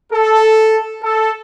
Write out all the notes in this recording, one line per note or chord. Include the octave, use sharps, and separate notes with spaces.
A4
A4